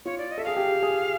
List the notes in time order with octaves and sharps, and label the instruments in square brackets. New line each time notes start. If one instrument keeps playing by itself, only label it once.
[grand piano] F4 [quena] C#5
[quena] D5
D#5
[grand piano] A4 [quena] E5
[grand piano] G#4 [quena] F5
[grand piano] G4
G#4